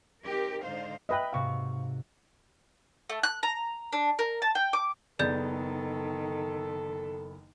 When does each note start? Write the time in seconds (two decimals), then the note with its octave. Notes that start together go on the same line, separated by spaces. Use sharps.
0.23 C4 D#4 G4 A#4
0.62 G#2 D3 D#4 C5 F5
1.09 B4 D#5 E5 G5
1.33 G#2 C3 F#4 F5 C#6
3.10 A3
3.23 F#6
3.43 A#5
3.93 D4
4.19 A#4
4.42 A5
4.55 G5
4.73 D6
5.19 F#1 D#3 B3 G#4 A4 D5 G6 A6